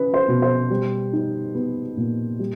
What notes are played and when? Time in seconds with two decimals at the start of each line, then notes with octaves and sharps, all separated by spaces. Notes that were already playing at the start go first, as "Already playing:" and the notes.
Already playing: C#4 E4 B4
0.14 C5
0.28 B2
0.42 C5
0.70 G3
1.13 D#4
1.55 B3
1.97 A#2
2.39 G3